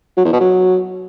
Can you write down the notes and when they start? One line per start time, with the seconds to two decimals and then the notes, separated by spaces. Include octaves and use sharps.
0.17 F#3
0.25 E2
0.33 B2
0.40 F#3